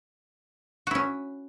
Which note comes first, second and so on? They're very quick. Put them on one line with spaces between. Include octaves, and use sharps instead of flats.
F#4 E4 C#4